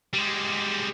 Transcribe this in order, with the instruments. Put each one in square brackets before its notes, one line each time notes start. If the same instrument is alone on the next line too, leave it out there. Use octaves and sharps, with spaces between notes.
[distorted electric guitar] G3 G#3